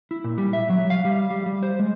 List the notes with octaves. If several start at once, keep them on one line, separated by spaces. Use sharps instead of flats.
E4
A#2
G3
E5
F#3
F5
G3
G3
G3
C5
G#3